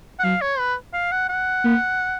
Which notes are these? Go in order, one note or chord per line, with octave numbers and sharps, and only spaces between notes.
F#5
F#3 F5
C#5
B4
F5
F#5
F#5
A#3